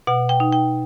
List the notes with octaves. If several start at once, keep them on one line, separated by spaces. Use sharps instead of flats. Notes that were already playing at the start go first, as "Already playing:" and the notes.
B2 F#5
G5
D#4
G5